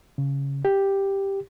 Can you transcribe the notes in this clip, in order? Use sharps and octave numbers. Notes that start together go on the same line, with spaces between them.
C#3
G4